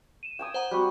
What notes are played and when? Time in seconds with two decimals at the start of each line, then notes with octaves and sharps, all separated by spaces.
0.23 D#7 E7
0.39 G5 G#5 D#6
0.54 C5 F#5 A#5
0.71 G3 C4 F#4